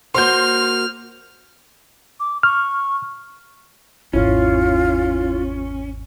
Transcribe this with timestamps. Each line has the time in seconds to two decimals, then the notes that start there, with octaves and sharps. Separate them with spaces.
0.14 A#3 F#4 C5 C6 F6 G6
2.20 D6
2.43 C#6 F6
4.13 G#1 E2 C#4 E4 F4 C#5